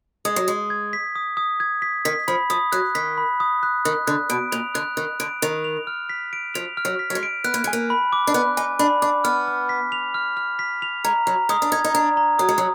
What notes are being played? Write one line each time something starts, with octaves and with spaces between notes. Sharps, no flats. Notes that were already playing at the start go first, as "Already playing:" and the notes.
G#3 D#6
F#3
G#3 D#6
G#6
B6
D#6
D#6
G#6
B6
D#3 B6
F3 B5
F3 D#6
F#3 F#6
D#3 B6
B5
D#6
F#6
D#3 F#6
D3 F#6
B2 D7
A#2 F7
D3 F#6
D#3 F#6
D3 D7
D#3 F7
F7
F6
B6
D7
F3 F7
F6
F#3
B6
F#3
G#3
D7
B3 F#6
A#3
G#3 G#5
A#3
B5
D6
D4
B3 F#6
D#4 G#5
D4 B5
D4 D6
B3 F6
F6
B6
F7
F6
F6
B6
F7
G#3 A#5
F#3 A#5
G#3 D#6
D4
D#4 G#6
D#4
D4 A#5
A#5
F#3 D#6
G#3
F#3